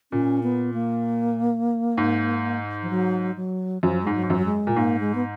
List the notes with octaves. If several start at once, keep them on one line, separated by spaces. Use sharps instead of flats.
A#2 C#4
B3
A#3
G#2
F3
F#3
F#3
F#2 F3
G#2 G#3
F#3
G#2
F#2 F3
F#3
G#3
A#2
G#2 A#3
G#3
B3